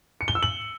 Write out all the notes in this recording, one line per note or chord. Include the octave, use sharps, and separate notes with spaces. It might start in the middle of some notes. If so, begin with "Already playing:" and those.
C#7
G7
E6
F#7